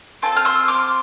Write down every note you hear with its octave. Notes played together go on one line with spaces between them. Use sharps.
C4 F4 A4 A5 C6
F6
C6 E6
D6 F6